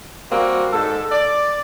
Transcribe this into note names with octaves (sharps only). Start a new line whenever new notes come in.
G3 A#3 C4 F#4
G#2 A4
D5